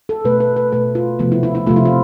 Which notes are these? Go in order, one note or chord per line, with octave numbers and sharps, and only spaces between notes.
A4
B2 A3 B4
B4
B4
B2 A3 B4
F4
C3 F3 A3 B3
E4
E4
E4
C3 F3 A3 F4
E4
F4